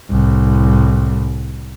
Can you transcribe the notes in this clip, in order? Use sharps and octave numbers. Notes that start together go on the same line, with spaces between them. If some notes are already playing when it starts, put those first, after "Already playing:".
C2 A2